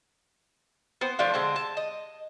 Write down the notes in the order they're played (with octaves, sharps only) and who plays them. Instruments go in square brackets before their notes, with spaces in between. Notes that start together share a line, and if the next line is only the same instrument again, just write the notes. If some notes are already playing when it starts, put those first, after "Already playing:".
[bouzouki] B3 C5 G5
F3 A3 D4 F5
D3 G#3 C4 A5
A5
D#5